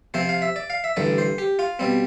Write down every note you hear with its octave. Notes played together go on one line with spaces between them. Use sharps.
C3 F3 C4 C5
F5
E5
D5
F5
E5
A1 G2 D3 D5
C5
G4
F4
B2 G3 C4